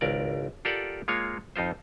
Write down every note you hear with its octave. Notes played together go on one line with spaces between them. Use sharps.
G#1 C#2 A#4 D5
F4 G4 A4 A#4 D5 F#5
G#3 A#3 F4 C#5
F2 D#4 F4 C5